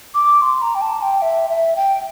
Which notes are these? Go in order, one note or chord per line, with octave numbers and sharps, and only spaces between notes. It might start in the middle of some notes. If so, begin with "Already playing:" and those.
D6
C6
A#5
G5
A5
G5
E5
E5
G5